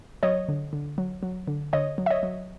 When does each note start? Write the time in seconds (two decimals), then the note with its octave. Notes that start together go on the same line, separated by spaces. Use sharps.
0.23 F#3 C#5 D#5
0.49 D3
0.73 D3
0.98 F#3
1.23 F#3
1.48 D3
1.73 D3 C#5 D#5
1.98 F#3
2.06 E5
2.11 C#5 D#5
2.23 F#3